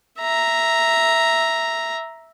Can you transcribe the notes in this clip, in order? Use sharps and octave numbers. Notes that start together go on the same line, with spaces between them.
E5 A#5